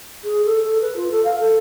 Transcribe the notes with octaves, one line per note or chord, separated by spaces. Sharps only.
G#4
A4
A4
B4
F4
A4
F5
A4